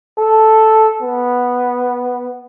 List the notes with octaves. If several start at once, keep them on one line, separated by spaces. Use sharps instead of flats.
A4
B3